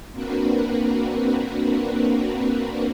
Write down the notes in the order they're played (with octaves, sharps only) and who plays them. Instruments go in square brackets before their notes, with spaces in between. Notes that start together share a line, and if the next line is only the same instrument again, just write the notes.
[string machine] A#3 C4 D4 F#4 A#4 B4